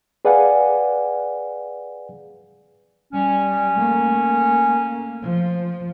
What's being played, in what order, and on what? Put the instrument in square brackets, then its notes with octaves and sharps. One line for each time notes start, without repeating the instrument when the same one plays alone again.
[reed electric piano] G#4 B4 D5 F5 F#5 G#5
[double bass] G3 [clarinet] C#4
[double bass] A3 A#3
F3